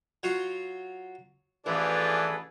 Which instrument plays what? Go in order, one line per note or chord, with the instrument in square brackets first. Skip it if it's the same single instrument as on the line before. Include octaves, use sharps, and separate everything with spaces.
[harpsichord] F#3 F4 F#4
[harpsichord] A1 [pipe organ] E3 [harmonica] F3 D4 F4 [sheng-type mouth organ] G#4 A4 B4